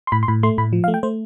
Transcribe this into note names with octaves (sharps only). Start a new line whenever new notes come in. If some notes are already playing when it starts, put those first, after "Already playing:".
C6
A2 B5
C6
A2 B5
A3 C6
A2 B5
F3
F5
A3
G5
A3 C5